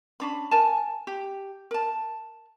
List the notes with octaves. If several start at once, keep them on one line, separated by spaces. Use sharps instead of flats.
C#4 D4 B5
A#4 G#5 A5
G4
A#4 A5